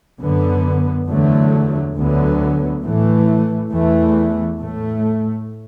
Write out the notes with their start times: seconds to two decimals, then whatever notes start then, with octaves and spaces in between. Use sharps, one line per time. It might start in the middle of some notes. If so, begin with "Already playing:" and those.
0.21 F#2 D3 B3
1.09 E2 D3 F#3 A3
1.96 D2 D3 F#3 B3
2.83 A2 E3 A3
3.71 E2 E3 A3
4.59 A2 A3